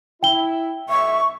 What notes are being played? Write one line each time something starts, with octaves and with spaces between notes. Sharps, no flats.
E4 G5 G7
B1 E5 C#6